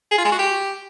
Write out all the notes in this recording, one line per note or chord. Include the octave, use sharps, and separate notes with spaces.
G#4
F4
G#3
F#4
G4